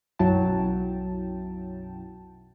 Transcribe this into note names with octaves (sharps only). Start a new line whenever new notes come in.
B1 F#2 F#3 E4 G5 A5